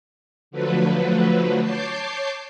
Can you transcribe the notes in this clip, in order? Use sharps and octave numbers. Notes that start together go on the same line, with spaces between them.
D3 F3 F#3 A3 B4
C#5 A5 D6 G6 C7